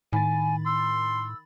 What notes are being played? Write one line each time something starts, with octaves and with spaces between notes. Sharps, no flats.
A2 D#3 G#5 B5 A6
C6 E6